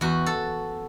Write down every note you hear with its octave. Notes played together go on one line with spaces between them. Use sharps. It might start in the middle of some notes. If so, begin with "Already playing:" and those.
E2 F#4
A4